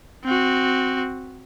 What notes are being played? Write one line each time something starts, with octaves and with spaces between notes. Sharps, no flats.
C4 F#4